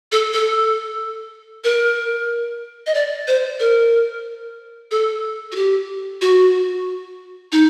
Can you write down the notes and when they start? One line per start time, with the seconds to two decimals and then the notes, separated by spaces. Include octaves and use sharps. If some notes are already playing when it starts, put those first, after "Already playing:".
0.12 A4
0.33 A4
1.64 A#4
2.86 D#5
2.94 D5
3.27 C5
3.60 A#4
4.91 A4
5.52 F#4
5.55 G4
6.21 F#4
7.52 D#4